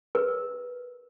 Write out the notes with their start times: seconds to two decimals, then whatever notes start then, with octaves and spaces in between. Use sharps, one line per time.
0.15 A#4 B4